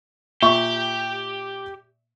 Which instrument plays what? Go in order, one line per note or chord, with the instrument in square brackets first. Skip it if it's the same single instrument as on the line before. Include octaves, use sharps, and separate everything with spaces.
[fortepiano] A#2 E5 C#6 [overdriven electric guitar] G4